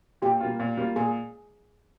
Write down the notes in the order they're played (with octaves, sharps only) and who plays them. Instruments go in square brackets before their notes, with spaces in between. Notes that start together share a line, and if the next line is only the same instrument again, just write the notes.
[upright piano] A#2 [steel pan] G4
[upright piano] G3 A#3 F4
A#2
G3 A#3 F4
[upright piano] A#2 [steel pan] G#4